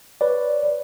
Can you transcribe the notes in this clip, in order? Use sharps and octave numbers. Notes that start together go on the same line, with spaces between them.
B4 C#5 D5